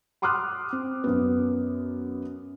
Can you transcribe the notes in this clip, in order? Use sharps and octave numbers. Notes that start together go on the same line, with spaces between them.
B5 C6 D6 D#6 F6 F#6
C4
F#2 B3